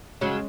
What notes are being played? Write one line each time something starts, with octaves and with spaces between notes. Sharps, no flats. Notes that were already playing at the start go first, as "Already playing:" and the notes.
C#3 F#3 G#3 C#4